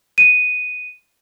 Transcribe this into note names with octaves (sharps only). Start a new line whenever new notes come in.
D#7